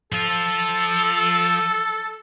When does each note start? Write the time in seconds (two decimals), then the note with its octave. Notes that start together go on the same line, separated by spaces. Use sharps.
0.13 F3 F4 A4